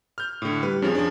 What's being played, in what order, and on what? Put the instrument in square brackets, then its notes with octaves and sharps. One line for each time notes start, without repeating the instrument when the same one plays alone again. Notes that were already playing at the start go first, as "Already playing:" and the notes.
[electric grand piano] F6 G6
A2 D3
[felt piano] G3 [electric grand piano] B4
[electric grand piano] F2 F3 [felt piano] C#4 G#4
[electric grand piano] F3 D4